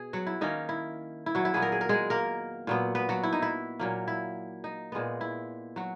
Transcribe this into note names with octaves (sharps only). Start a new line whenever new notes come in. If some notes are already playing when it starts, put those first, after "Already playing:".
Already playing: B2 G#4
F#3 F#4
E4
D#3 A#3 C#4 D#4
E4
E4
F#3 F#4
E4
A#2 F#3 B3 G#4
A#4
G#4
A#4
G#3 G#4
A#3 A#4
A#2 F#3 B3
B3 B4
F#3 F#4
E4
D#4
E4
A#2 F#3 A#3
E4
D#4
A#2 G#3 B3
E4
F#3 F#4